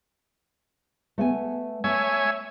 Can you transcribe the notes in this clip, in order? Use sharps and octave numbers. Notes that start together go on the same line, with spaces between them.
A3 B3 G#5
A3 C#5 E5 G#5